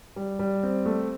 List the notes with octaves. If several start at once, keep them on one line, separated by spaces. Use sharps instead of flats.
G3
G3
C4
A3